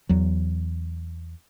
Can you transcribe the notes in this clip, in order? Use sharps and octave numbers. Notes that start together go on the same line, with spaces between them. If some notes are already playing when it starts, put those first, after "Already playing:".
E2 F#3